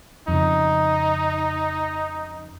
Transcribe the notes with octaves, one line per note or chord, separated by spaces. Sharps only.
F2 C#3 D#4